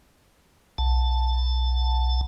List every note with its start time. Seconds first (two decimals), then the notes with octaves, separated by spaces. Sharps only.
0.78 B1 A5